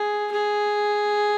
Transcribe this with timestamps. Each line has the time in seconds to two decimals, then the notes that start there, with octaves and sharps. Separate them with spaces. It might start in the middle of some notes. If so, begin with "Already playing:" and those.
Already playing: G#4
0.32 G#4